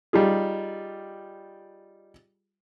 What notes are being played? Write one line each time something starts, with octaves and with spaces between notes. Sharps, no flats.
G3 D#4 F4 G#4